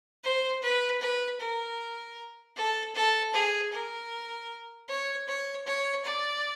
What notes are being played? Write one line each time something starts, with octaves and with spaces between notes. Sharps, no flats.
C5
B4
B4
A#4
A4
A4
G#4
A#4
C#5
C#5
C#5
D5